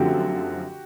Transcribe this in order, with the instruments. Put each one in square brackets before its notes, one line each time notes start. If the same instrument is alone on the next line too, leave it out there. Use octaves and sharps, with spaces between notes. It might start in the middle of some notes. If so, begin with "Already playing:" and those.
Already playing: [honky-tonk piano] F#2 D3 F3 A3 C4 [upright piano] F#4 G4